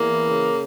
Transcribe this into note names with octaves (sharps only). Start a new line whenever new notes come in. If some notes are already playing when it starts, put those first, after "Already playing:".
Already playing: E2 A#3
E3
C#3